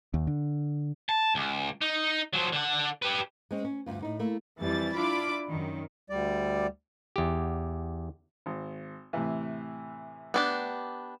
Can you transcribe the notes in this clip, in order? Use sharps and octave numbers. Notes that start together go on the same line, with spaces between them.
D#2
D3
A5
C#2
D#4
F3 F#3
D3 F#5
G4 B4
G#3 C4 C#4
C#4
D2 G2 F4
A2 D#4
A3 A#3 E4
F2 E3 G3 A6
D4 E4 F4 B5 D6
F#2 D#3
D2 G3 D5
E2 G4
G#1
A2 C3 E3
B3 D4 G4